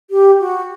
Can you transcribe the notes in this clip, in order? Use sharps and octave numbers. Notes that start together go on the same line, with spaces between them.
G4
F#4